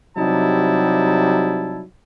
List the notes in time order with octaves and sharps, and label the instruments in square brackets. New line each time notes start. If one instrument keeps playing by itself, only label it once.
[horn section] C3 F#3 G3 D#4 E4 A5